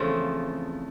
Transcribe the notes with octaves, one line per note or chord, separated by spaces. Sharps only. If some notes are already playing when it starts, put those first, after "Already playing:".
Already playing: E2 C#3 F3 A3 C4